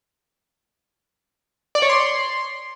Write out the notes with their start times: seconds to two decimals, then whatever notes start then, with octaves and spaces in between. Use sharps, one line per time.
1.75 D5
1.82 C#5
1.89 C6